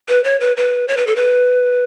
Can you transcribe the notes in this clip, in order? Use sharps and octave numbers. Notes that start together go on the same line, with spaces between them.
B4
C#5
B4
B4
C#5
B4
A4
B4